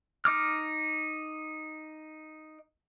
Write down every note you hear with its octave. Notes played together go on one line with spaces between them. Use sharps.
D#4 D6 F6